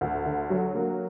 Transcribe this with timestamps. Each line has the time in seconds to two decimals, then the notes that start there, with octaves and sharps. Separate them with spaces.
0.01 D2
0.26 D3
0.50 F#3
0.75 A#3